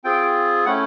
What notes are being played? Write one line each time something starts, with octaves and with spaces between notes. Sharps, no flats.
C4 F4 G#4 G5
A3 C#4 E4 F#5